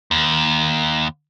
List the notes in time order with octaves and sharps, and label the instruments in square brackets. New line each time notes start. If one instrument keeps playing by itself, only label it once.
[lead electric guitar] D#2